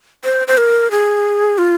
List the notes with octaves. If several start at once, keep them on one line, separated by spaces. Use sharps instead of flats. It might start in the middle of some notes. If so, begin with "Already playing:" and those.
C5
C5
A#4
G#4
F4